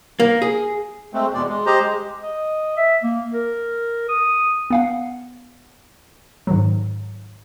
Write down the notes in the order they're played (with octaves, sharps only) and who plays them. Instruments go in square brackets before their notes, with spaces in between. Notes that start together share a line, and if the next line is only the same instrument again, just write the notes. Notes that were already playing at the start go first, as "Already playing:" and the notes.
[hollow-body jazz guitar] A#3
G#4
[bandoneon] G#3 A3 C4
E2 B2 G#3 D5
G#3
G4 C5 D#5 A#5
G#3
[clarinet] D#5
E5
A#3
A#4
D#6
[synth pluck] B3 F5 F#5
G#2 D#3 F#3